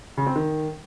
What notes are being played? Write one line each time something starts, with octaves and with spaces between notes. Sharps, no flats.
C#3
C4
D#3